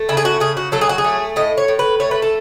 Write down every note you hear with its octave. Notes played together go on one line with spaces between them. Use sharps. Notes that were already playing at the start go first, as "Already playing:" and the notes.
Already playing: A3
C#3 E4
G#4
F#4
C#3 G#4
F#4
F#3 A4
G#4
F#4
G#4
A3
A2 D#5
C#5
A2
B4
A3 C#5
B4
A4